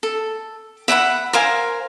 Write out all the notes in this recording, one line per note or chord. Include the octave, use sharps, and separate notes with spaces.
A4
E5 F#5 G#5 B5
A#4 C5 F5 G#5